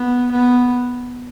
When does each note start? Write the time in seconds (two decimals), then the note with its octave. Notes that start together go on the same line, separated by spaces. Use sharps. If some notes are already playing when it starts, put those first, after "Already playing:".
Already playing: B3
0.31 B3